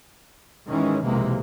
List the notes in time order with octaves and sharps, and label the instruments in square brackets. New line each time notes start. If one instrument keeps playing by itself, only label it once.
[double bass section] G#1 D#3 E3 G#3 C#4
B1 F2 C3 E3 G#3 A#3